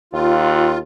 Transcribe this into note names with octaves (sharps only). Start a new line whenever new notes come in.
D#2 F4